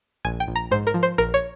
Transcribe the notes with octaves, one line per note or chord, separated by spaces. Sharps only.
A#1 G#5
G5
A#1
A#5
G#2 C5
A#4
F3
C5
A#1 A#4
C#5